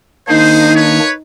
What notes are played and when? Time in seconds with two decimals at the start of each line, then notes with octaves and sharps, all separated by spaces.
0.28 D#3 A#3 D4 D#4 G#4 C5
0.76 B4 C#5